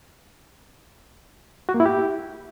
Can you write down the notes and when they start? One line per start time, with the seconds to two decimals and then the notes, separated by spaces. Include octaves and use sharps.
1.69 F#4
1.74 A#3
1.80 E4
1.86 G4